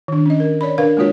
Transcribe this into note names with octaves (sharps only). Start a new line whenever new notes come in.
D#3 D4
C#4 D#5
A#4
C#5 D5 B5
D4 A#4 B4 F5
G#3 A#3 D4 F4 F#4 C#5